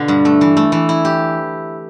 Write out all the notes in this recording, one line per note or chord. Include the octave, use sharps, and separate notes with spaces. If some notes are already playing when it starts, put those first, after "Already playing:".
Already playing: B2 D3 D4 F4
G2
A3
E3
A3
E3
E4
G4